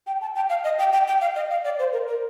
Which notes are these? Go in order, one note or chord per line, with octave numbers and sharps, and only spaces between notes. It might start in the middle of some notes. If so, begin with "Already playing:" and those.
G5
A5
G5
F5
D#5
G5
G5
G5
F5
D#5
F5
D5
C5
A#4
A#4